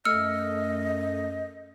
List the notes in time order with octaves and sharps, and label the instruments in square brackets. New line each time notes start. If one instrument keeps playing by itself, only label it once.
[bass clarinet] F#2 [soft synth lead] A3 [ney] D#5 [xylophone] E6 F6 C#7